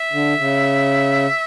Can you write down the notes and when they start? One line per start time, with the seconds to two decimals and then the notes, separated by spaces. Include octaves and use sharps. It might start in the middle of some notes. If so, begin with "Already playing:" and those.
Already playing: E5
0.12 D3
0.37 C#3